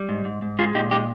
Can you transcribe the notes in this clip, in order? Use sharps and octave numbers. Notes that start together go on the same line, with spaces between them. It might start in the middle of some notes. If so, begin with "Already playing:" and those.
Already playing: G3
G#2
G#2
G#2
G#3 F4 G#4
A#2 D#4 G4
G#3 D#4 G4